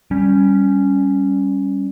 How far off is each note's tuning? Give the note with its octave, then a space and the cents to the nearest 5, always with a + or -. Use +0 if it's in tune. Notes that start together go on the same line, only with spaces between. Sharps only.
G3 +0 C#4 +0